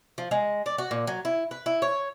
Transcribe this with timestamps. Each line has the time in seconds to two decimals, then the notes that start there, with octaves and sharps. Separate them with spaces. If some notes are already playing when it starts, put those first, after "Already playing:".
0.18 F3
0.31 G#3
0.66 D5
0.78 F#4
0.91 A#2
1.07 F#3
1.25 E4
1.51 B4
1.66 E4
1.82 C#5